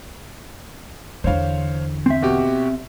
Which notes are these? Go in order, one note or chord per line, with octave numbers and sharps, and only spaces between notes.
E2 D3 C5 C#5 F5
C4 E5
B2 F#4 G4